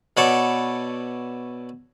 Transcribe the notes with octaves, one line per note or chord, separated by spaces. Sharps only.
B2 B3 A4 C#5 D5 A5